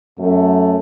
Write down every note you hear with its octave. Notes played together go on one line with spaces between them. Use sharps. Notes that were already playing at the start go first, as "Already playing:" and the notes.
F#2 A3